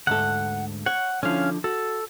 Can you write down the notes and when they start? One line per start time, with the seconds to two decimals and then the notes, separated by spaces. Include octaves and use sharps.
0.07 D2 G#2 A4 F#5
0.86 C#5 F#5
1.23 D3 F3 C#4 E4 F5
1.64 F#4 A4